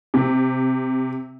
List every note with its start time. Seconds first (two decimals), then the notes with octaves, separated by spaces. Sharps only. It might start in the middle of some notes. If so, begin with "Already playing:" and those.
0.14 C3